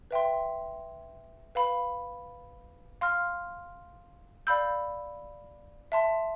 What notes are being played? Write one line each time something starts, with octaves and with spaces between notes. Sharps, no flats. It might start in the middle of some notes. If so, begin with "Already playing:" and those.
B4 E5 G5 C6
B4 F5 B5
F5 C6 F6
D5 F5 B5 E6 G6
E5 A5 C6